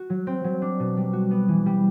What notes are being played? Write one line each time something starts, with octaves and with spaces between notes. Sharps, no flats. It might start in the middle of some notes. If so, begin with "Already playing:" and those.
Already playing: F#4
F#3
C4
F#3
D4
B2
G3
F#4
B3
E3
G3